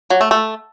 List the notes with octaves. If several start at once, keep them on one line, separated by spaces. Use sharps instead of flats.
F#3
A3
A3